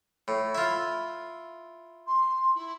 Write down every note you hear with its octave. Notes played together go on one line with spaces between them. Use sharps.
A2
E4 F4
C6
E4